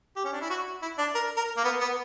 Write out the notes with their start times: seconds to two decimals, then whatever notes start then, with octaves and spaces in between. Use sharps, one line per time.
0.16 G4
0.24 C#4
0.33 D4
0.41 E4
0.50 F#4
0.82 E4
0.98 D4
1.15 A#4
1.37 A#4
1.57 A#3
1.64 B3
1.81 B3